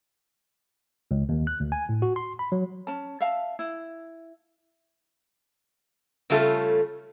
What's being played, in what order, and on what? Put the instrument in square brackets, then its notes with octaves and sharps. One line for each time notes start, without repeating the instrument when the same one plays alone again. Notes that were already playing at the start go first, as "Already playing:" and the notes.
[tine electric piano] C#2
D#2
F#6
D2
G#5
A2
F#4
C6
B5
F#3
[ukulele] C#4 A5
E5 F5 A5
E4
[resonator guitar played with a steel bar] C#3 G3 A3 C#4 F4 A4